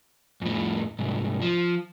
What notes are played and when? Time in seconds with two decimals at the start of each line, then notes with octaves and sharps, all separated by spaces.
0.42 F2 A2
0.99 C2 G#2
1.42 F3